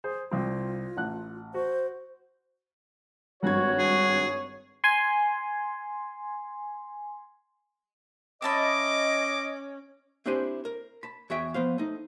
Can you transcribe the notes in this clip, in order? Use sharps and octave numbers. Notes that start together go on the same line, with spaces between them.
G#4 C5
C2 C4 F4
A1 F#5 F#6
F#4 C5
G#1 G2 F#4 C#5 G#6
G#4
G#5 C6
C#4 D#5 E5 A5 B5 D6
C4 D4 E4 G4 C5 G#5
A#4
A5 B5
E2 F#4 G#4 E5 G5
F3 B3 C5 F5
A3 D#4